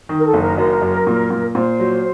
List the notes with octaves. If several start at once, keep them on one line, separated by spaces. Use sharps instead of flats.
D#3
A#4
A4
F#1
A#4
F#2 A#4
F#2
A#2
A#2
A#2 C5
F#3